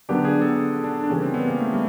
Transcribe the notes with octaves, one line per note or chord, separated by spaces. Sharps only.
D3 F#3 B3 D4 G4
G#4
A4
D4
D4
C#3 E3 G3 A#3 C#4
C4
B3
A#3
A3
G3